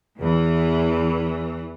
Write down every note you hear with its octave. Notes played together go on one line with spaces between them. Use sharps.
E2 E3